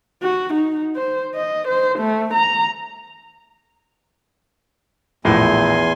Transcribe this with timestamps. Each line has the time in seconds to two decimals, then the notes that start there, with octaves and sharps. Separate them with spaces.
0.22 F#4
0.53 D#4
0.96 C5
1.34 D#5
1.68 C5
1.99 A3
2.34 A#5
5.25 A#1 E2 A2 G#5 C6